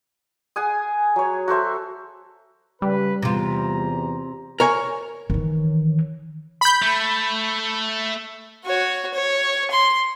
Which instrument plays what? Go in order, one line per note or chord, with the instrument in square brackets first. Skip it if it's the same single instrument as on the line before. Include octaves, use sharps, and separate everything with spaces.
[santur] G#4 F#5 G#5 D#6
F#3 C#5
F#4 A4 C5 E5
[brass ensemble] C#3 B4 [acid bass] G3
[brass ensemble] E2 A#5 [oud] C3 F4
[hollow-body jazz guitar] A#4 C#5 G#5
[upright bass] D#3 E3
[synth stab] B5 G6
[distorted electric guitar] A3
[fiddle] F#4 C#5
C#5
C6